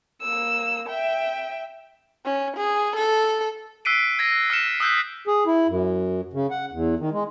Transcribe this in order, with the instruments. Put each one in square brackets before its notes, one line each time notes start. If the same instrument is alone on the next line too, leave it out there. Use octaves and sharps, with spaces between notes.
[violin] A#3 E6
E5 G5
[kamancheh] C#4
G#4
A4
[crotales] E6 F#6 B6 C7 D7 D#7
G#6 A#6 D#7
E6 F6 C#7 E7
D#6 E6 F#6 G6 B6
[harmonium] G#4
E4
F#2
C#3
F#5
E2
D#3
G#3